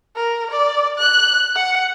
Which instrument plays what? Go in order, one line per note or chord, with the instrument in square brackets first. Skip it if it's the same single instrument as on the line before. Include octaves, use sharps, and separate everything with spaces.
[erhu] A#4
D5
F#6
F#5